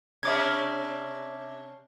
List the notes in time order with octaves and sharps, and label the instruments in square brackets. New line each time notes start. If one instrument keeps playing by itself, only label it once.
[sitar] C3 C#4 D4 [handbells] E5 D6 G#6